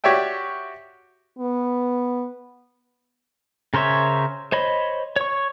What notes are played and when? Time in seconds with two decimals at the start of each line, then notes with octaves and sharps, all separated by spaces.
0.04 F#4 G4 C#5 D5 E5 G5
1.39 B3
3.74 C#3 A#4 C5 C#5 E5
4.52 C5 C#5 D#5 B5
5.16 C#5 C#6